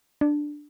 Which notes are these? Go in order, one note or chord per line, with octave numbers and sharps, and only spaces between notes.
D4